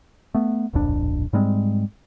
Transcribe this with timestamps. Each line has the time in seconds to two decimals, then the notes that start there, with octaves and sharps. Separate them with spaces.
0.35 A3 B3
0.73 D1 A#1 F2 D4
1.33 G#2 G3 G#3 C4